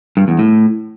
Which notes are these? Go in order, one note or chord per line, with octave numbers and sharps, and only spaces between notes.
G2
E2
A2